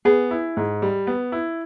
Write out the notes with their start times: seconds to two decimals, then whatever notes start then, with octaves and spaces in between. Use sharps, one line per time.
0.05 B3 G#4
0.31 E4
0.57 G#2
0.82 G3
1.07 B3
1.32 E4